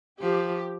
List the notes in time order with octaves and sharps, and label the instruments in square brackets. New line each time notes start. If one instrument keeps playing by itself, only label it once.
[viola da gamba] F3 [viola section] G4